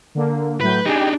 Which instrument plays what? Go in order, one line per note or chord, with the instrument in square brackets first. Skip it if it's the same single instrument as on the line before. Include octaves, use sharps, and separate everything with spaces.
[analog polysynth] D3 A#3
[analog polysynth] A2 F#3 G6 [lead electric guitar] B4
[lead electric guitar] D4 D#4 [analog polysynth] G4 G#4